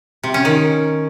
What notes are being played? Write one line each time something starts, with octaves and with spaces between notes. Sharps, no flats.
C3
C#4
D#3